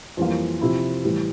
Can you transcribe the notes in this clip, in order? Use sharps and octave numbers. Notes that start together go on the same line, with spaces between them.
F2 E3 G3 A#3 F4
C3 F3 C4 E4
A2 E3 G3